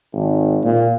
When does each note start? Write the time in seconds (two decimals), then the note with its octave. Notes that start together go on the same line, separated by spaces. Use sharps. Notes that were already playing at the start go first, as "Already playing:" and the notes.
0.13 G#1
0.63 A#2